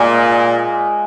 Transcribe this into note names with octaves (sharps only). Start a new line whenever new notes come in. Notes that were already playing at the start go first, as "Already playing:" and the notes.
Already playing: A#2 G#3 F4 G#4